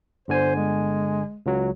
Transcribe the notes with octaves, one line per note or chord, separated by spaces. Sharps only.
G1 D3 C5 G#5
G#3
C#2 F#3